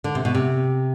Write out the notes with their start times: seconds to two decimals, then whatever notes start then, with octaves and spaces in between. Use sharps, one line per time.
0.04 D3
0.15 C3
0.25 B2
0.35 C3